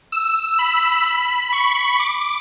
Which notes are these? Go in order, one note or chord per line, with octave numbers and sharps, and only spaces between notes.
E6
B5
C#6
D6